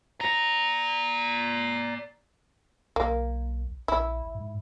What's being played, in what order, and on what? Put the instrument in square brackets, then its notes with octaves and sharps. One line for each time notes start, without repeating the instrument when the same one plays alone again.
[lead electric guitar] D5 A#5
[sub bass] B1 [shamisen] A#3
[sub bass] A#1 [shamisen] E4
[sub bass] G#2